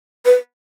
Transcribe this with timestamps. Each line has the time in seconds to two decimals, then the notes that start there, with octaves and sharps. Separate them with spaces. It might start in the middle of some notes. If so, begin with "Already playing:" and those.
0.26 B4